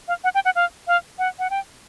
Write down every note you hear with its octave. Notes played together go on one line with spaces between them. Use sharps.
F5
F#5
G5
F#5
F5
F5
F#5
F#5
G5